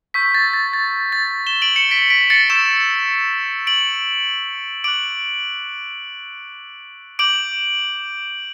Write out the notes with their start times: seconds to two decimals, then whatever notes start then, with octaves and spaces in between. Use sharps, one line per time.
0.14 C#6 E6 G6 B6
0.34 A6
0.53 A6
0.73 A6
1.12 A6
1.46 E7 G7
1.62 D7 F#7
1.76 C#7 E7
1.91 B6 D7
2.10 B6 D7
2.30 A6 C#7
2.50 C#6 E6 G6 C#7 E7
3.67 D7 F#7
4.84 D6 F#6 D7 F#7
7.19 D6 G6 D7 F#7